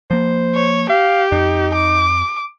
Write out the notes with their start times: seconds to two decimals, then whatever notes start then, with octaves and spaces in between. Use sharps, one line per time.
0.11 F3 A#3 C5
0.55 C#5
0.90 G4 F5
1.32 F2 D#4
1.74 D6